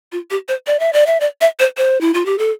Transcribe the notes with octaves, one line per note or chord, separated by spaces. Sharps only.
F4
G4
C5
D5
E5
D5
E5
D5
E5
C5
C5
E4
F4
G4
A4